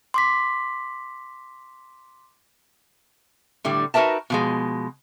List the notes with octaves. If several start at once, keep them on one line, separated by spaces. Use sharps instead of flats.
C6 D6 B6
A2 D3 G3
D#4 F#4 A#4 B4 E5 A5
B2 F3 G#3